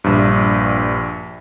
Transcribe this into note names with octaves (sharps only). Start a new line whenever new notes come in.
A#1 G2